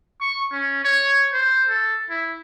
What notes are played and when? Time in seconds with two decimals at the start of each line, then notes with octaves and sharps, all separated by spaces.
0.20 C#6
0.52 C#4
0.84 C#5
1.33 C5
1.69 A4
2.10 E4